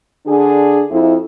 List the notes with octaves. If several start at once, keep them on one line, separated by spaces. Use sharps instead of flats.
D3 D4 G#4
F2 E4